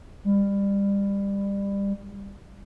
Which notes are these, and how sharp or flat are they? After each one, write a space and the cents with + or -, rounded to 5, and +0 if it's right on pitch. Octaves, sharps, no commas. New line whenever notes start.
G3 +25